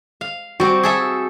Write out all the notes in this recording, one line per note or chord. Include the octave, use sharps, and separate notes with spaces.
F5
G3 C4 F#4
G#4 A4 E5